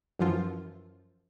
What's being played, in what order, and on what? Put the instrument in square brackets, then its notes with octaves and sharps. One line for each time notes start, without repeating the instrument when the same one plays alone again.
[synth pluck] F#2 E3 F3 F4